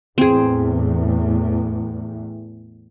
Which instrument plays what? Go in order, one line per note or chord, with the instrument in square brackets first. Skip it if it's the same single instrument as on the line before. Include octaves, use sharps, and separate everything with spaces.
[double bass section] E2 A2 [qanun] C4 G#4